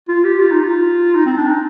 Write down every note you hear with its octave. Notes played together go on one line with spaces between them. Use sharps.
F4
G4
F4
D#4
F4
D#4
C4
D4
D#4